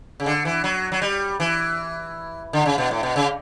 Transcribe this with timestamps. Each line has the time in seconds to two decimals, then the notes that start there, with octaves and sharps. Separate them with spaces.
0.20 C#3
0.26 D3
0.45 E3
0.64 F#3
0.92 F#3
1.02 G3
1.40 E3
2.53 D3
2.66 C#3
2.78 B2
2.91 A2
3.03 B2
3.16 C#3